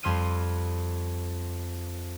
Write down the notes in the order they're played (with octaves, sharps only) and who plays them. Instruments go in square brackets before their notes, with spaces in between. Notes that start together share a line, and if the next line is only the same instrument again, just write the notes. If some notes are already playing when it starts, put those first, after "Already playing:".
[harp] F2 G3 C6 F6 D#7